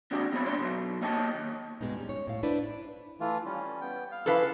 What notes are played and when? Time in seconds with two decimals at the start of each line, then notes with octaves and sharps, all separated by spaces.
0.11 D#2 C3 G#3 D4 F#4 G4
0.32 E3 B3 C4 C#5 B5
0.46 D#2 G#2 D4 C6
0.58 B2 F3 F#3
1.01 A#3 C#5 D#5 G5 A5
1.34 D#2
1.81 G2 B2 D3 G#3 B3 D#4
1.97 G3 C#4
2.09 C#5
2.27 A2 F5
2.43 D4 E4 B4 C5 D5
3.20 E3 A3 F4
3.45 G3 C#4
3.81 B3 G5
4.12 F5
4.26 E3 F3 E4 A4 B4 F5